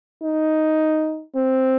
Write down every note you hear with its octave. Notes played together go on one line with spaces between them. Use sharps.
D#4
C4